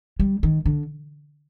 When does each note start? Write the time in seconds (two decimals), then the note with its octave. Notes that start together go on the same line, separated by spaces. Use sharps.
0.20 G3
0.43 D#3
0.65 D3